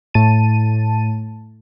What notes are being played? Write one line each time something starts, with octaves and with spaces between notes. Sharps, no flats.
A2 A5 D#7